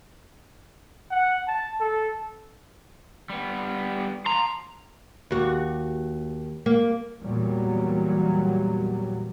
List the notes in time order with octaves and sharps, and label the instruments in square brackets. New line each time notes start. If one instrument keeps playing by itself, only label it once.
[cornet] F#5
A5
A4
[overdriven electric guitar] G3 B3
[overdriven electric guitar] A5 C6 [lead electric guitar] A#5
[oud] D#2 F#4
A#3
[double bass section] E2 A#2 F#3 G3